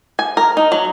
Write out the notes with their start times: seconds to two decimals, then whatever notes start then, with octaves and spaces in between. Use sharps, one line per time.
0.19 G#5
0.37 A#4
0.57 D#4
0.72 F#3